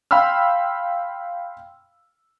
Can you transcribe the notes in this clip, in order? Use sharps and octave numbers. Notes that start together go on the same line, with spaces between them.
F5 G5 B5 C6 E6 F6